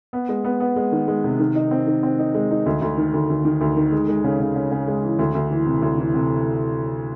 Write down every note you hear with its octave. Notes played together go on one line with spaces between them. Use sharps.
B3
G#3
B3
B3
G#3
D#3
G#3
C3
D#3
D#4
C4
D#3
C4
D#4
G#3
D#4
D2
D2
D#3
D2
D2
D#3
D2
D#3
G#3
G#3
C#3
C#3
C#3
C#3
G#3
E3
D2
D2
E3
C3
D2
E3
C3